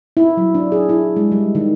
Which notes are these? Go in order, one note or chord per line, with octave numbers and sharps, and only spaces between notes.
E4
F#3
D4
G#4
E4
G#3
G3
D#3